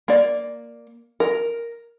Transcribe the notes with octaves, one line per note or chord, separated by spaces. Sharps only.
A#3 D5
A#4